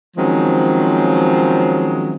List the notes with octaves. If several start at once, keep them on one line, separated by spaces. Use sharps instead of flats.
D#3 F3 F#3 G#3 C4 C#4